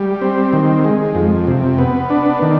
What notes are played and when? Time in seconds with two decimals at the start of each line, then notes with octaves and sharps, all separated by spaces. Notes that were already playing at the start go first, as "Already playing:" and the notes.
Already playing: G3
0.21 C4
0.53 D#3
0.84 G#3
1.15 F2
1.47 C3
1.78 B3
2.10 D4
2.42 D#3